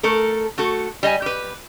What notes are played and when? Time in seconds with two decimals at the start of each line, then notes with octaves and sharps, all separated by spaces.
0.03 A3 A4 A#4
0.58 A3 F#4 A4
1.03 G3 D#5 G#5
1.22 G4 B4